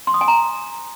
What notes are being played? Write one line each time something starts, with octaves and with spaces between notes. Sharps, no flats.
C6
D#6
G#5
A#5